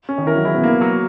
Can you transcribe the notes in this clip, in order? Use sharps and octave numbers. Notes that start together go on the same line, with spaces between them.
C#4
D#3 D#4
E3 E4 A#4
F#3 F#4
C#3 C#4 E4
B2 B3
A#3
F#3